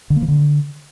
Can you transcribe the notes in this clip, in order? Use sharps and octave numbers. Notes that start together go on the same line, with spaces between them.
D3
A#3
E3
D3